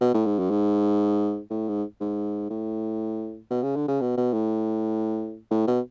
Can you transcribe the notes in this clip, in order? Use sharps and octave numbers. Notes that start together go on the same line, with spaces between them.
B2
A2
G#2
F#2
G#2
A2
G#2
G#2
A2
B2
C#3
D3
C#3
B2
B2
A2
A2
B2